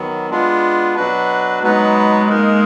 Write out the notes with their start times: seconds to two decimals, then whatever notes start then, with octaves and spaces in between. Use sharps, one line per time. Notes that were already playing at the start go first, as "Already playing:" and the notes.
Already playing: D#3 F#3 B3
0.30 G#3 B3 D4 F4
0.96 B2 F#3 D4 F#4 B4
1.63 F#3 G#3 B3 D#4 F#4 B4
2.29 A#3 D#4 A#4